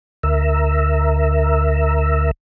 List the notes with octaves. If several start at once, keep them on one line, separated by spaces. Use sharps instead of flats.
D2 A#4 E5